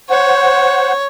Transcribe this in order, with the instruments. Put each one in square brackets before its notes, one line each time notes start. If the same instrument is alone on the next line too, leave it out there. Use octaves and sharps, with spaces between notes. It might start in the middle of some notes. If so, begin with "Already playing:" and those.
[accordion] C5 F#5 [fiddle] C#5